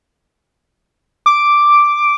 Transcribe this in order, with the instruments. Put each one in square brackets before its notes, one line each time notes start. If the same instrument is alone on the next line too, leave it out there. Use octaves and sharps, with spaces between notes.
[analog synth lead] D6